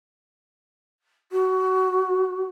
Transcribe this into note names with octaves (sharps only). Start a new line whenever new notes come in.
F#4